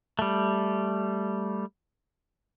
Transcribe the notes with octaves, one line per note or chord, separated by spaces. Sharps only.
G3 A3